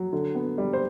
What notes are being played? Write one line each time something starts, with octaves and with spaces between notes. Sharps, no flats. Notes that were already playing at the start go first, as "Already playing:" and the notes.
Already playing: F#3
D3
B3
G3
C5